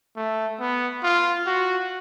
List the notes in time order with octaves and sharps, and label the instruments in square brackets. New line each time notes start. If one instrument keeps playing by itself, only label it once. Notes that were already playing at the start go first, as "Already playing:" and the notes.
[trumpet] A3
B3
F4
F#4